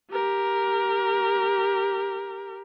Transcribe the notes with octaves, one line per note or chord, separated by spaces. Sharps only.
G4 A#4